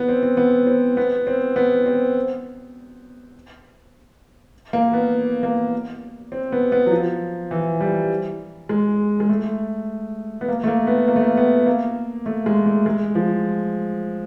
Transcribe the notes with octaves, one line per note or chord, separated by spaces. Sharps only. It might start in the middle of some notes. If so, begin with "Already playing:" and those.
Already playing: B3
C4
C4
B3
C4
B3
C4
B3
C4
A#3
B3
A#3
C4
B3
B3
F#3
F3
E3
G3
G#3
G#3
A3
B3
A#3
A3
A#3
B3
A#3
A3
A#3
B3
A#3
A3
G#3
A3
G#3
F3